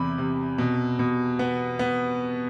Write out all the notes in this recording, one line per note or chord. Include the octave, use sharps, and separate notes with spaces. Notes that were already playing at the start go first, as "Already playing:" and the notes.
Already playing: E2 C3 B5 D6
C3
B2
B2
B3
B3